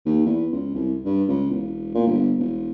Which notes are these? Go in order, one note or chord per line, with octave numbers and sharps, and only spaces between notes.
D#2
E2
C#2
C2
G2
C#2
E1
A#2
G1
E1